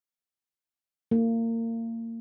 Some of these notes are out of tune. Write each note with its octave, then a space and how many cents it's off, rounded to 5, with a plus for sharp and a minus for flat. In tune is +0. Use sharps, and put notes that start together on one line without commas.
A#3 -30